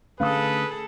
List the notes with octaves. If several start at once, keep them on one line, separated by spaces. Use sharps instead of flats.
D3 A3 C#4 G#4 A4 B4 F5 D#6